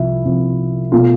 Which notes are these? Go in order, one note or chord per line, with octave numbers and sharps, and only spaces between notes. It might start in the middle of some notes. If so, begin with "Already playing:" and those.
Already playing: C2 C3 F3 E4
C2 C3 F3
B2 A3 F4